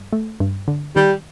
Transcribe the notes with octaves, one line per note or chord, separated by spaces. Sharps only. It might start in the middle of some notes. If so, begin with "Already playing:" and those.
Already playing: G2
A3
G2
D3
D#3 G3